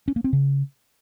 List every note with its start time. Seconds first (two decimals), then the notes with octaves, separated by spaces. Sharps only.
0.08 C#4
0.16 A#3
0.24 C4
0.33 C#3